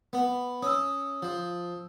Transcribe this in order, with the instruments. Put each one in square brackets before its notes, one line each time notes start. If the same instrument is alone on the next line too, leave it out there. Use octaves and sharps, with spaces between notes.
[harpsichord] B3
[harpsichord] C#4 [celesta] D#6 E6
[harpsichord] F3